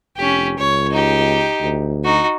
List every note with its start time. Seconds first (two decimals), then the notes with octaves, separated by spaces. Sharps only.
0.17 F1 C#4 G4
0.58 C#2 C#5
0.91 D#4 G4
1.61 D2
2.04 D#4 F#4